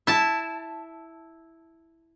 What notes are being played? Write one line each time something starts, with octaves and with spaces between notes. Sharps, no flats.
E4 A5